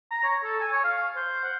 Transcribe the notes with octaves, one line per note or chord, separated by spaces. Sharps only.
A#5
C#5
A4
G#5
C#5
F5
C5
F#5